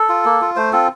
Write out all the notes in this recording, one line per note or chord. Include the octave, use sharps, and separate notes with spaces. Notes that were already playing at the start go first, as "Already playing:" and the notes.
Already playing: A4
F4
A#3
F4
A3 C5
C4 F4 A4